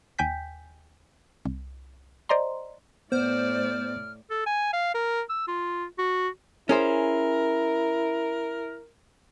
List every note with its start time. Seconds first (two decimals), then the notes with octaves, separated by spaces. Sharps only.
0.19 D#2 G5 G#5 G6 B6
1.45 C2
2.29 C5 D5 D#5 A#5 C6
3.12 A2 B3 C5 D5 F6
4.30 A4
4.46 G#5
4.73 F5
4.94 A#4
5.29 E6
5.48 F4
5.98 F#4
6.69 C#4 E4 G#4 A#4 C5